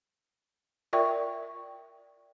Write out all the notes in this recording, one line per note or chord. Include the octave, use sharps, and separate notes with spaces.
F4 A#4 D5 E5 G5 C#6